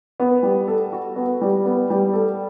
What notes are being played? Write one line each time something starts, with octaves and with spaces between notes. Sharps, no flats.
B3
G3
A4
F#4
B3
G3
B3
G3
A4